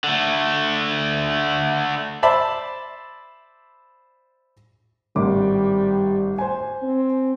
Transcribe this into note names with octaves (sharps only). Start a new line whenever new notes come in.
D3 A3
C5 D5 E5 A5 B5
G#1 A2 G3 D6
C5 G#5
C4